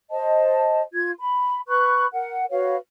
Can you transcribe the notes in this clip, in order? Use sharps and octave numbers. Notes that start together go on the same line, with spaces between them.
C5 D#5 A5
F4 G#6
B5
B4 B5 C#6 F#6
A#4 F#5
F#4 B4 C#5 F5